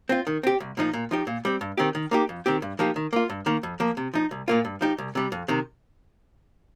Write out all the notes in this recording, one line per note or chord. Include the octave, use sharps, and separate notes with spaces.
C4 F4
D#3
C4 G4
C2
A#2 F3 D#4
A#2
F3 D#4 G4
A#2
G3 C4
G2
D#3 C4 D#4 G4
D#3
A#3 D#4 G4
F2
D#3 C4 G4
G2
F3 A#3 D#4 G4
D#3
A#3 F4
G2
D#3 A#3
F2
F3 A#3
C3
F3 D#4
C2
A#2 A#3 F4
G2
F3 D#4 G4
C2
C3 G3
F2
C3 D#3